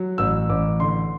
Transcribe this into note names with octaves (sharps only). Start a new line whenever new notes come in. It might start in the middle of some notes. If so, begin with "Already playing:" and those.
Already playing: F#3
A1 E6
A1 D6
D3 C6